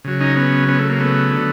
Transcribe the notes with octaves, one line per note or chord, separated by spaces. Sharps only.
C#3 F#3
C#4 D#4
B3 C#4
B3 C#4
A3
A#3
A3 B3
D3 F#3